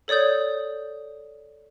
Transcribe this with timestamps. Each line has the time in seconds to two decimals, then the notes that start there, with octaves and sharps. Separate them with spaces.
0.08 A4 C#5 D5 D#6 G6